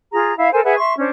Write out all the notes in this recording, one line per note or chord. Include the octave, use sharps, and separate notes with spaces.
F4 G#4 A#5
E4 E5 F5
A4 A#4 C5 G#5
G#4 B4 E5 F#5
E5 C6 C#6
C#4 D4 C5